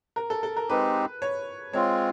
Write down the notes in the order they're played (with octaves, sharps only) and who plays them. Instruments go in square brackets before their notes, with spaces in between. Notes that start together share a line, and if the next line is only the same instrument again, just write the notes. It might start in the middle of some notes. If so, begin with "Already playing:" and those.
[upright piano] A#4
A4
A4
A#4
[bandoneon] G#3 C4 D#4 G4 [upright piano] B4
[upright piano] C#5
[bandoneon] G#3 C4 F4 [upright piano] C#5